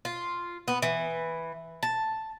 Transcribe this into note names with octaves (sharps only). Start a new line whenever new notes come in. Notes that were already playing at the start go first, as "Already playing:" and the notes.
F4
B3
E3
A5